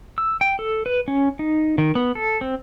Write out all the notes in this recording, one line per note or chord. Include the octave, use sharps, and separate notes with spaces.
E6
G5
A4
B4
C#4
D#4
D#3
B3
A4
C4